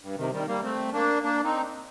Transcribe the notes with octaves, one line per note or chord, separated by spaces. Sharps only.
G2
C3 D#3
D#3 G3
G3 A#3
A3 C4
A#3 D4
A#3 D4
C4 D#4